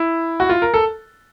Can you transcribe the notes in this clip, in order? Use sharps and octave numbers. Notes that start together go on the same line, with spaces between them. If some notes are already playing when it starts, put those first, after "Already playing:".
Already playing: E4
F#4
F4
A#4
A4